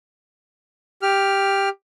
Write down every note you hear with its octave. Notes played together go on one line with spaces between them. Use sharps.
G4 F6